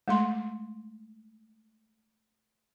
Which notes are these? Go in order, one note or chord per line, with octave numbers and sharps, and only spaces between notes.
G#3 A3 C6